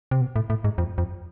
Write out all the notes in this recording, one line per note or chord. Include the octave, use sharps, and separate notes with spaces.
C3
B2
A2
A2
G#2
F2
F2